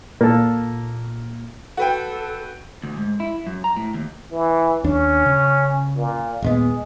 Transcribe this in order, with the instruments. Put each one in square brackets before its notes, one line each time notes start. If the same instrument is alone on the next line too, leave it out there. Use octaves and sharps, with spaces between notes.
[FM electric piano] A#2 [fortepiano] A#3 A4
[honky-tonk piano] F#4 B4 G5 [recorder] A4
[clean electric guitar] D2
G#2
E4
F#2
A#5
A2
D#2
[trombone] E3
[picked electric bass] D#2 D4 [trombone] C#4
[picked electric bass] C#3
[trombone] A#2
[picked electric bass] D#1 A#2 B3 [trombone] G#3